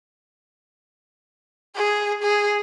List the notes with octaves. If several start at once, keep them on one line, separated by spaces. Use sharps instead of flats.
G#4
G#4